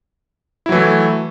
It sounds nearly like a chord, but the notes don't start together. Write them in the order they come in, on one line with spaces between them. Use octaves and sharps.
E4 F#3 E3 A3